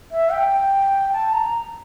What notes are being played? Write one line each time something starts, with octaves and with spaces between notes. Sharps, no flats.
E5
G5
A5
A#5